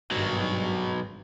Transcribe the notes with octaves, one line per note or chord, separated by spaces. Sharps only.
G#1 G2 B2 F#3